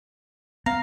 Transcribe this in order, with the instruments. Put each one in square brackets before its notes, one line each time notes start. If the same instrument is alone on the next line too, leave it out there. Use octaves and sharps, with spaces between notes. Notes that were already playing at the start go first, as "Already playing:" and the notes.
[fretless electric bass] B3 [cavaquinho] F5 [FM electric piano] A#5